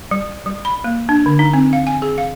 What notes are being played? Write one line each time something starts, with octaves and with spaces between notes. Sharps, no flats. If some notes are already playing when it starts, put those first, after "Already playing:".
G3
G3
B5
A#3
D4
D3
D#4
C4
F5
G#5
G#4
F5